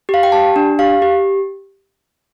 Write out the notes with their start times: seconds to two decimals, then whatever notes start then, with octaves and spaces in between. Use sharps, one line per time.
0.09 G4 F5
0.23 G5
0.32 G4 A5
0.56 D4
0.79 G4 F5
1.02 G4